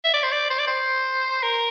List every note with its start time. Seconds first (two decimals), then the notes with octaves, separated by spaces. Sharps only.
0.04 E5
0.13 D5
0.23 C5
0.31 D5
0.50 C5
0.59 D5
0.67 C5
1.43 A#4